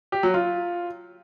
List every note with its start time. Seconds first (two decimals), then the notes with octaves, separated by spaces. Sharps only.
0.12 G4
0.23 F#3
0.34 F4